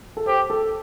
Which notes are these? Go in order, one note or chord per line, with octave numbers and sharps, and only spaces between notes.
A4
G4 C5
A4